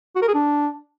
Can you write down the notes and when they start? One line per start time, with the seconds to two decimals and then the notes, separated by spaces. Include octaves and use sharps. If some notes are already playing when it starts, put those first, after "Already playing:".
0.16 F#4
0.22 A#4
0.28 G#4
0.34 D4